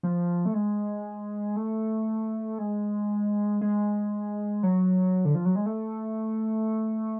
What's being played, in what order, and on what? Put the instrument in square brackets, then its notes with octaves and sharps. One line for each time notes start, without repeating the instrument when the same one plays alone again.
[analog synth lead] F3
A3
G#3
A3
G#3
G#3
F#3
D3
F3
F#3
G#3
A3